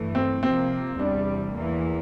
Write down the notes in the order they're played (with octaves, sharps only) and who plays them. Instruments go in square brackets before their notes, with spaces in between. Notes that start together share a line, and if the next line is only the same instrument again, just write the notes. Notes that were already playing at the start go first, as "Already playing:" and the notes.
Already playing: [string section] G2 E3 A3
[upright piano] C4
[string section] C3 F3 A#3 [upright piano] C4
[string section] E2 C3 G3 [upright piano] D4
[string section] E2 E3 A#3